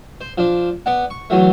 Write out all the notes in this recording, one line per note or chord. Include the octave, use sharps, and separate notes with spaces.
C5
F3 D4
B3 D5 F#5
C#6
E2 E3 F#3 A3